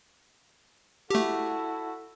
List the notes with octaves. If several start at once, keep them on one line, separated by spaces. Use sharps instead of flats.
A3 E4 F#4 G4 A4